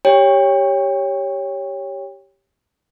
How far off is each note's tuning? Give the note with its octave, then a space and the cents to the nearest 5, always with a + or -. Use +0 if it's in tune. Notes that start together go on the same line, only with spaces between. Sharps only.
G4 +0 C#5 +0 G5 +30